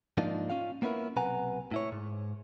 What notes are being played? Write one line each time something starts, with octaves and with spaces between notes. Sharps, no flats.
G#2 F3 A#3 D4 D#4 F4
C#4 F4 F5
A#3 B3 C#4 E4 A#4
B1 C3 B4 F#5 G#5 A#5
A2 E4 C#5
G#2